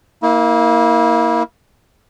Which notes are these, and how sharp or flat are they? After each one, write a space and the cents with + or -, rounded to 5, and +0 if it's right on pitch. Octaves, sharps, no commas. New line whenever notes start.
A#3 +0 E4 -35